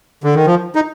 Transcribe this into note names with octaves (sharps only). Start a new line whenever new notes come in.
D3
D#3
F3
D#4